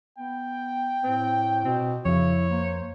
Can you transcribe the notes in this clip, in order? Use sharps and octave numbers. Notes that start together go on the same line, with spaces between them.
B3 G5
A2 C4
B2 C4
F2 C#3 E4 C#5
A#3 C5